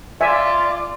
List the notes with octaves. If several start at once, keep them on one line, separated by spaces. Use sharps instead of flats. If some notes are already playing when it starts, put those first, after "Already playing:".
F4 D5 E5 G#5